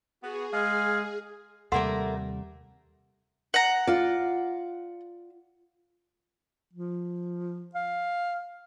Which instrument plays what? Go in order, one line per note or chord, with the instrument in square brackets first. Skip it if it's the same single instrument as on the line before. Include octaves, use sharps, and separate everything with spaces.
[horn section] B3 F#4 [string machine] G#4
[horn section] G#3 G#5 [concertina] F5
[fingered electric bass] D#2 C3 G3 [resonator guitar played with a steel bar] A3 A#3 A#4 [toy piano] F#5 C6
[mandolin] F#5 A#5
[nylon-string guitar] F4 D5
[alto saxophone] F3
F5